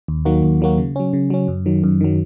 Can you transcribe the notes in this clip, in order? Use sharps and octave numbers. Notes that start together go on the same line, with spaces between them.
D#2
D#3 F#3 A#3 F#4
D#2
D#3 F#3 A#3 F#4
C#3
F#3 C#4
C#3
F#3 C#4
F#2
D#3 F#3
F#2
D#3 F#3